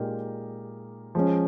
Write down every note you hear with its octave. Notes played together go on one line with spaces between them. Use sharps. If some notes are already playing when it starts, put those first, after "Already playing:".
Already playing: A#2 G#3 D#4 G4 A#4
F3 G#3 C#4